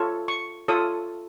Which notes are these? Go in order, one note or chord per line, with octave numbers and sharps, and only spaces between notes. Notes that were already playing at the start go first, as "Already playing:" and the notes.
Already playing: F4 A4 C#5
C#6
F4 A4 C#5 D#6